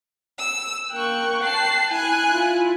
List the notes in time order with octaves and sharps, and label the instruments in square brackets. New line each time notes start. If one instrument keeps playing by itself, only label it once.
[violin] E6
[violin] A#3 C#6 [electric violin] G5 F#6
[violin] A5 C7
[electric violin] E4 [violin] G#5 F#6
[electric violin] E4 F4